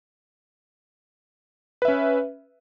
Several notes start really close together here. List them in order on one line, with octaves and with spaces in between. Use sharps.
B4 E5 C#4